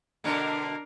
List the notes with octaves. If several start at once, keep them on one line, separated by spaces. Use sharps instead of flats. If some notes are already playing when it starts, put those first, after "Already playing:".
B2 D3 A#3 D4 A#4